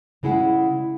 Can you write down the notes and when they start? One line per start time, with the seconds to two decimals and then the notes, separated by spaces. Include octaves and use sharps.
0.23 C#3 G#3 E4 G#4 F#5